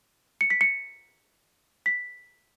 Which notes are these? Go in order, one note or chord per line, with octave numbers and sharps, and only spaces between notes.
C#7
B6
C#7
B6